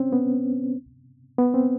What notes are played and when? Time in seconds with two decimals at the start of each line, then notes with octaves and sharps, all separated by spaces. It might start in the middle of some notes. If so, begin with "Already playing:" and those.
Already playing: C4 C#4
0.13 B3
1.38 B3
1.54 C4